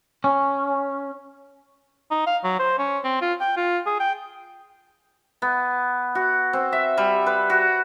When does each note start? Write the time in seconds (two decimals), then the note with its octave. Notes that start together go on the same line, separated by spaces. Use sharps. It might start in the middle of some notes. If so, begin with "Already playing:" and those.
0.24 C#4
2.11 D#4
2.27 F5
2.44 F#3
2.59 C5
2.79 C#4
3.04 C4
3.22 F4
3.40 G5
3.57 F4
3.86 G#4
4.00 G5
5.42 B3
6.15 F#4
6.53 C4
6.73 E5
6.97 G3
7.26 B4
7.50 F#4